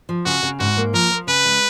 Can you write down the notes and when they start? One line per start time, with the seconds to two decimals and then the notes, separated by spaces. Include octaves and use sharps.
0.09 F3
0.25 C#3 F#4
0.43 C#3
0.59 G#2 F#4
0.77 A#3
0.93 F3 A#4
1.11 F3
1.27 C#3 B4
1.45 G#3